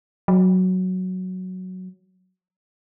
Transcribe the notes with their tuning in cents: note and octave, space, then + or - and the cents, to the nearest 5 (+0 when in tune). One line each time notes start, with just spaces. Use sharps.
F#3 +0